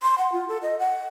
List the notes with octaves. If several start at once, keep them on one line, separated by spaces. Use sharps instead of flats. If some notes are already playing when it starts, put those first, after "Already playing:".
C6
F#5
F4
A4
D#5
F#5